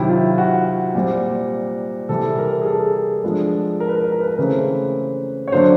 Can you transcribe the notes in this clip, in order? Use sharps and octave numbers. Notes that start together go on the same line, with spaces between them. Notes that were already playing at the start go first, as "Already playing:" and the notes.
Already playing: C3 D#3 F#3 E4
F4
F#4
A#2 G3 C4
C3 E3 G3 A4
A#4
G#4
A4
F3 G#3 B3 D4
A#4
B4
A#4
B4
A#4
B4
A#4
C#3 E3 A3 C4 B4
C#5
D3 F#3 A#3 D4 C5